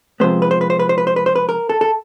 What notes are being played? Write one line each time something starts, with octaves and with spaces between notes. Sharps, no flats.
C3 F3 G#3 B3 C5
B4
C5
B4
C5
B4
C5
B4
C5
B4
C5
B4
A#4
A4
A4